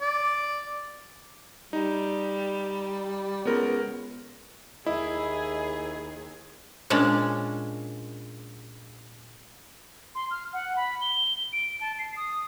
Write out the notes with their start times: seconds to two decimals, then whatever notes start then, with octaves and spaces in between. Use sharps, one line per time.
0.01 D5
1.73 G3 D#4
3.45 C#2 B3 A#4
4.86 D#2 E4 G#4 D#5
6.90 A#2 G#3 C#4 D4
10.15 C6
10.31 F6
10.53 F#5
10.76 B5
11.01 G7
11.53 D7
11.81 A5
11.99 C7
12.16 D#6